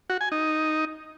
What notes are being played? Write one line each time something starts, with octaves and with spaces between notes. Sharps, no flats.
F#4
G#5
D#4